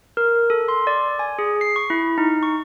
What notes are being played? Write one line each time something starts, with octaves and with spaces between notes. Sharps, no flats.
A#4
A4
C6
D5
G#5
G#4
C7
C#6
E4
D#4
C#6